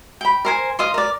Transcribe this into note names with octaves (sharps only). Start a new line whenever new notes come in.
G5 B5
A#4 C5 G#5
D#5 F5 C6
A#4 D5